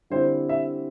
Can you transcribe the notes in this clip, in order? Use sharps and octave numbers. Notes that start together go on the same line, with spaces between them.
D3 G3 C4 E4 C5
E5